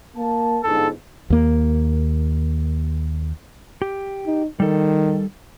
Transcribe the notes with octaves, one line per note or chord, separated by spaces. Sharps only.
A#3 A5
G1 G#2 A4
D#2 A#3
G4
D#4
D#3 G3 A4